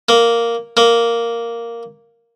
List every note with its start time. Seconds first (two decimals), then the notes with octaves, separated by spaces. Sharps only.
0.09 A#3
0.77 A#3